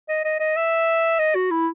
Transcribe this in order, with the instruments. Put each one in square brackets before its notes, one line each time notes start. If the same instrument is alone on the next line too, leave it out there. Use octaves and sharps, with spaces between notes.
[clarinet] D#5
D#5
D#5
E5
D#5
F#4
E4